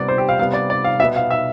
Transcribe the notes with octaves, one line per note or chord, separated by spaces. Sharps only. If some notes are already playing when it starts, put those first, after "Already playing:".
Already playing: C3 G3 B3 D5
C5
G4
F5
C3 G3 B3 F5
D5
D5
F5
B2 B3 E5
F5
E5